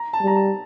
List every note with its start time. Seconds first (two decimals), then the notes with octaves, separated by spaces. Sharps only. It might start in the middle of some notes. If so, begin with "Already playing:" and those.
Already playing: A#5
0.13 A5
0.21 G3
0.27 A#5
0.36 A5